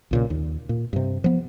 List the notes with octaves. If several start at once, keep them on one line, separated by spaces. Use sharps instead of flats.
B1 A#2 C#3
D#2
A#2
G2 C3
F3 B3